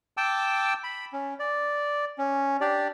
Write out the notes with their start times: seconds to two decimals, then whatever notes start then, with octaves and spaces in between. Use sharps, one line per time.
0.17 G5 A5 D6 E6
0.84 B5
1.13 C#4
1.39 D5
2.18 C#4
2.61 D4 G4 D5